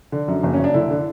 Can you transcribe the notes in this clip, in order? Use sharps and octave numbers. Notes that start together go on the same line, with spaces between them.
D3
F#2
F#1
C#4
F#1 D4
D3 E4
D3